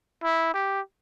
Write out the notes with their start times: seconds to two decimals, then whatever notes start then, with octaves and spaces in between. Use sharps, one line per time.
0.24 E4
0.54 G4